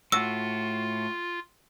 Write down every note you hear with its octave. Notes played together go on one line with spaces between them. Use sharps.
A2 F4 F#4 E6